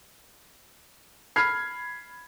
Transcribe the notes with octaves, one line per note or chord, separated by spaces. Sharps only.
B5 F6 G#6 C7